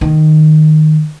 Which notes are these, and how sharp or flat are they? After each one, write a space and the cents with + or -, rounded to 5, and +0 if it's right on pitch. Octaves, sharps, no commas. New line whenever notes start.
D#3 -10